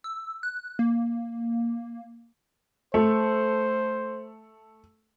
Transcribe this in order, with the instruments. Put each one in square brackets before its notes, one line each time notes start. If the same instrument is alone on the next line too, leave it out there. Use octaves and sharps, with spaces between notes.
[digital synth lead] E6
F#6
A#3
[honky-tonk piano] A3 [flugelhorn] C5